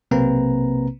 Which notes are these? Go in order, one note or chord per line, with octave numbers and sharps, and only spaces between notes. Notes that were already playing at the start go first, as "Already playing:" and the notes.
B1 C3 A#3 C4 B4 A#5